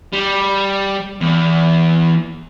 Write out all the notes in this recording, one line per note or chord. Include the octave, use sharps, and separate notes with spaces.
G3
E2